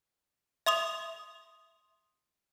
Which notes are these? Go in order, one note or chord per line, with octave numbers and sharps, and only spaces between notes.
E5 C6 D#6 F7